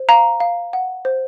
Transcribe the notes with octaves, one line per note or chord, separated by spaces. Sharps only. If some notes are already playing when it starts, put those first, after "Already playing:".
Already playing: C5
F5 A#5
F5
F#5
C5